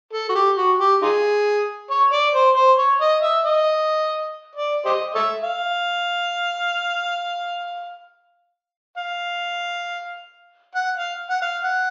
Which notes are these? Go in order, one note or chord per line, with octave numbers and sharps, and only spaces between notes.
A4
F#4
G4
F#4
G4
D#4 F4 G#4
C#5
D5
C5
C5
C#5
D#5
E5
D#5
D5
G4 C5 D#5
A4 C#5 E5
F5
F5
F#5
F5
F#5
F5
F#5